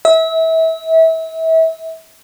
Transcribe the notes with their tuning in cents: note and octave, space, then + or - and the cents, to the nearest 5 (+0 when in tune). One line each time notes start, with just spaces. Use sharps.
E5 -30